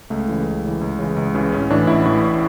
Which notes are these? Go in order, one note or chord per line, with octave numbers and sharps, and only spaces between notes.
C#2 A3
C#3 E3
C#2
C#3 E3
C#2
C#3 E3
C#2
C#3 E3
A1 C#4
A2 E3 D4
A1 E4
A2 E3